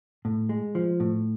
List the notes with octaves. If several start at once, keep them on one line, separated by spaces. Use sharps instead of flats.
A2
G#3
F3
A2